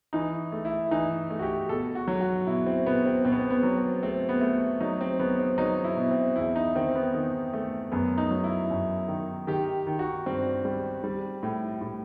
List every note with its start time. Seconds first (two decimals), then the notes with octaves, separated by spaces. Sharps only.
0.13 E3 D#4
0.52 A3
0.65 E4
0.91 E3 D#4
1.30 A3
1.39 F#4
1.42 G4
1.69 B2 A4
1.95 F#4
2.08 F#3
2.21 F#4
2.47 B2 E4
2.66 C4
2.86 B2 B3
3.05 C4
3.25 B2 C4
3.32 B3
3.39 C4
3.50 B3
3.63 F#3
3.77 C4
4.03 A3 C4
4.29 B3
4.41 A3
4.80 F#3 D#4
5.01 C4
5.19 F#3 B3
5.39 C4
5.58 F#3 D#4
5.84 E4
5.97 B2
6.11 C4
6.36 E2 E4
6.56 D#4
6.75 D#3 C4
6.95 B3
7.15 D#3
7.54 A3
7.91 F#2 B3
8.18 D#4
8.31 F#3
8.44 E4
8.71 F#2
9.08 D#3
9.47 D#3 G4
9.87 D#3
9.99 F#4
10.26 G2 C4
10.65 G3
11.04 G3
11.43 A2
11.81 A2